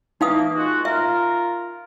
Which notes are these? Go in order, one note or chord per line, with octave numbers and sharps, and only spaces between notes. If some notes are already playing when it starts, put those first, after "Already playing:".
E3 A#3 D#4 F5 D#6
G#3 F4 F#4
F4 A#4 E5